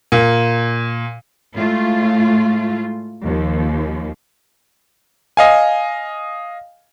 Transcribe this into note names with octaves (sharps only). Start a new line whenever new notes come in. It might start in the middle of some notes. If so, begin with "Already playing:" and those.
A#2
A2 G#3 A3 F4
D#2 F3
D#5 F5 G#5